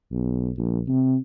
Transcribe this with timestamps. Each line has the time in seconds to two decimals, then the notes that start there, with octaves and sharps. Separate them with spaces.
0.11 B1
0.58 A#1
0.88 C3